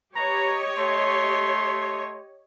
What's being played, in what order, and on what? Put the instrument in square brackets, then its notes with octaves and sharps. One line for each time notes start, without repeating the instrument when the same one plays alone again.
[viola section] G4 C#5 D#5 [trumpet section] B4 A#5
[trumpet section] A3 C6